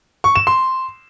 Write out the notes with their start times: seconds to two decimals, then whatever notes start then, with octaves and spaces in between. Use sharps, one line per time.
0.24 C#6
0.36 E7
0.47 C6